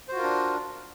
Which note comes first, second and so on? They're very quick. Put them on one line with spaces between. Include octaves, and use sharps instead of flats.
C5 F#4 F4 A#4 D4